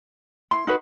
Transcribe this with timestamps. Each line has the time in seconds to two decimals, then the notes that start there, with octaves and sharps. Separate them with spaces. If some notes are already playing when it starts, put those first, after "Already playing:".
0.51 E4 C6
0.67 D#4 F#4 B4